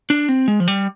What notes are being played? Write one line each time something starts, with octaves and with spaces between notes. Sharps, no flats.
D4
C4
G#3
F3
G3